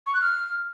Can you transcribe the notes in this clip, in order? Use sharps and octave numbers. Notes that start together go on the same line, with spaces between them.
C#6
F#6
F6